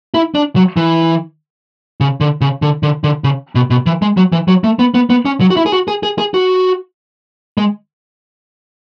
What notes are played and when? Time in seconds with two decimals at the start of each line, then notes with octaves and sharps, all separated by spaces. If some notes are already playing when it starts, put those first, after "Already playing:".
0.14 E4
0.35 D4
0.56 F#3
0.77 E3
2.01 C#3
2.21 D3
2.41 C#3
2.62 D3
2.83 D3
3.04 D3
3.24 C#3
3.55 B2
3.70 B2
3.86 E3
4.02 G#3
4.17 F#3
4.32 E3
4.48 F#3
4.64 A3
4.79 B3
4.94 B3
5.10 B3
5.25 C#4
5.40 F#3
5.50 F#4
5.57 E4
5.66 G#4
5.72 F#4
5.88 G#4
6.03 G#4
6.18 G#4
6.34 F#4
7.58 G#3